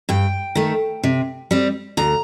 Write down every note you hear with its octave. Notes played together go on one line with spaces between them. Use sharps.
G2 G5
D#3 A3
C3
G3 C4
D2 A#5